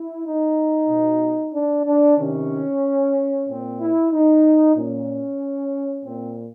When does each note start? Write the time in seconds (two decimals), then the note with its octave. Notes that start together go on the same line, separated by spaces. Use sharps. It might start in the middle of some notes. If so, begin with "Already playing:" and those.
Already playing: E4
0.25 D#4
0.89 B2
1.54 D4
1.86 D4
2.18 C3 D#3 C#4
3.47 A#2 C4
3.80 E4
4.11 D#4
4.76 A#2 C#4
6.05 A#2 C4